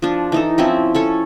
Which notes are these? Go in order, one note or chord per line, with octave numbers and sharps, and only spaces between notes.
F3 D4
E3 D#4 A4
F3 C4 C#4 E4
C#4 A4 C#5